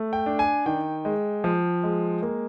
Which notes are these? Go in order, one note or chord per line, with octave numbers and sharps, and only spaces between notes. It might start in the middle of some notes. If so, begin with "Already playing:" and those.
Already playing: A3
G5
D4
G#5
D#3 G5
G#3
F3
G#3
A#3